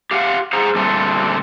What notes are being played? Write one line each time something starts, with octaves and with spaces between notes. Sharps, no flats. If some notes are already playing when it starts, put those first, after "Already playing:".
G4 F5 F#5
G#4 C5 F#5 A#5
A#2 D3 G3 A3 C4